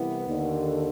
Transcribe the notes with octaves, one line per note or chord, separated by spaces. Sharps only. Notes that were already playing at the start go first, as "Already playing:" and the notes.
Already playing: C2 C3 E3 B3
D#2 D3